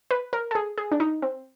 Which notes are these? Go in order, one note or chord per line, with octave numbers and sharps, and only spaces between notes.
B4
A#4
A4
G#4
G#4
D4
D#4
C4